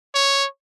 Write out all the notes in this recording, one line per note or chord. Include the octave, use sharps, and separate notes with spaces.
C#5